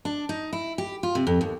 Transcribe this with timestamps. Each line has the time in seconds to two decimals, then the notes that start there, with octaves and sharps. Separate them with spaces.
0.05 D4
0.29 D#4
0.53 E4
0.78 G4
1.03 F4
1.15 C3
1.27 F2
1.41 D#2